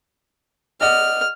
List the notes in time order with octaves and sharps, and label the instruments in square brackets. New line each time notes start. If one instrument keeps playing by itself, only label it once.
[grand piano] D5 D#5 F#5 [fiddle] F6